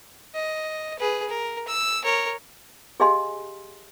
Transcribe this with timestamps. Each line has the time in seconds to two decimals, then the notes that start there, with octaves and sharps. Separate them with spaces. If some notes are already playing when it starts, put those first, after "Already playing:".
0.35 D#5
0.99 G#4 B4
1.29 A#4
1.68 E6
2.04 A#4 C#5
3.00 G4 G#4 D#5 F5 G#5 C6